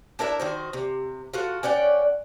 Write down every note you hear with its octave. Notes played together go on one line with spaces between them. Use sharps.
D4 E4 A#4 E5
D#3 F#4 C5
C3
F4 F#4 A4
C#4 D5 F#5 G5